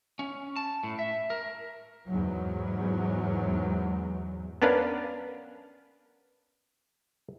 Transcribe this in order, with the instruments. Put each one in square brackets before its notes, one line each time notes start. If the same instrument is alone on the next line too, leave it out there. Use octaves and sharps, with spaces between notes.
[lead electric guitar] C#4
A5
A2
E5
A#4
[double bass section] E2 G#2 F#3
[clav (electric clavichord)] B3 C#4 D4 A#4 B4 F5